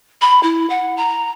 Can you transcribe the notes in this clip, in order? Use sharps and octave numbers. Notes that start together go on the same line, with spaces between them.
B5
E4
F#5
A#5